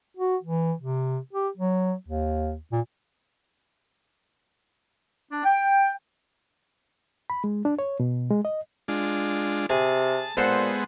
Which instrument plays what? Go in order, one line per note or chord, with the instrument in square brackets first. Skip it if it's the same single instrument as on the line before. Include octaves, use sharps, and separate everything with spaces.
[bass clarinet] F#4
E3
C3
G4
F#3
D#2
A#2
[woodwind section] D4
G5
[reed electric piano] B5
G#3
D4
C#5
B2
G#3
D#5
[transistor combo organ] G#3 D4 F4
[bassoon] C3 [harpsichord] G#4 [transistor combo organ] A5
[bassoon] A#2 [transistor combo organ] G#3 B3 [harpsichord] A4 C5 F#5